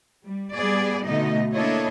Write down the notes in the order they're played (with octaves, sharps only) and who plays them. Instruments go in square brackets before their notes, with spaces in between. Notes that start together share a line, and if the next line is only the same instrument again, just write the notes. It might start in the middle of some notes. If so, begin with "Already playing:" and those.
[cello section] G3
G3 B3 G#4 D5
B2 D3 A3 D#4 D#5
A#3 D4 E4 A4 C#5 D#5